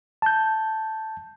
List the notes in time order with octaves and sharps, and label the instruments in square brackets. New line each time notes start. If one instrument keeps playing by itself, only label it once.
[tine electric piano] A5 G6